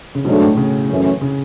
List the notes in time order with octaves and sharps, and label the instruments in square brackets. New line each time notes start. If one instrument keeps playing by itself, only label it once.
[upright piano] C#3
[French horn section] G#2 F#3 A3 D4 [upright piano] B2
[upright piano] A2
C#3
[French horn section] F#2 E3 A3 C#4
[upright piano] C#3